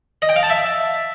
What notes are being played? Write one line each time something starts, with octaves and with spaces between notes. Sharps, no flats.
D#5
G5
F5
A5
E5